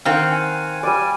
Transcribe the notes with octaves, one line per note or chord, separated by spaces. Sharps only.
D#3 C4 F5 F#5
G#5
G3 D5 G#5